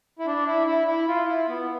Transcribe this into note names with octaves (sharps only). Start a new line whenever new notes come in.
E4
D4
E4
E4
E4
F4
E4
B3